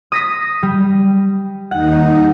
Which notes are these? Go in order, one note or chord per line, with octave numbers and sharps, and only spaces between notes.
D#6 A#6 B6
G3
D#2 D#4 F#5